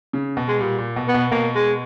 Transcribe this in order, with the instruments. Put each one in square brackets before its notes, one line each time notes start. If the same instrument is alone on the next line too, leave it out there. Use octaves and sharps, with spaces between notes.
[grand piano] C#3
B2
[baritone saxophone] G#3
[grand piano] A#2 [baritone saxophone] G3
[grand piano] A#2
B2
[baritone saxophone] B3
[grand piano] B2
[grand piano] B2 [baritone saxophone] A#3
[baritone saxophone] G#3